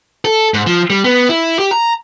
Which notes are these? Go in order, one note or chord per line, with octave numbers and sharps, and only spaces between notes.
A4
G#2
F3
G3
B3
E4
G4
A#5